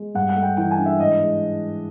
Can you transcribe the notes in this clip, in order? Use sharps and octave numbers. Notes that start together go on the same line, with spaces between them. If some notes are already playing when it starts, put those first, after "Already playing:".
Already playing: G#3
G2 F#5
F#5
A3
G5
E3 G5
G#5
D4
E5
G#2 D#5
G#3